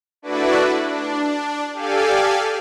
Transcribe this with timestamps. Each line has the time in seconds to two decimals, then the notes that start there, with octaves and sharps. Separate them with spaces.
0.22 A3 D4 E4 F#4 B4 D5
0.83 D4
1.73 G4 A4 D5 F5 G#5